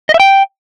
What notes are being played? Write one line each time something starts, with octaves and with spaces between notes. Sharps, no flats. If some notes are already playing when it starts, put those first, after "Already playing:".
D#5
E5
G5